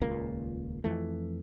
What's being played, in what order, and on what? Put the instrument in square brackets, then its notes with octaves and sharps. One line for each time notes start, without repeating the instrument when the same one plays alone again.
[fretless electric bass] D#1 C#2 A#2 A#3
F2 E3 A3